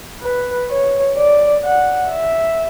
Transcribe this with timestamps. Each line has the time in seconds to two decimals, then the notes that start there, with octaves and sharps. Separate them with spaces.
0.22 B4
0.70 C#5
1.16 D5
1.64 F#5
2.10 E5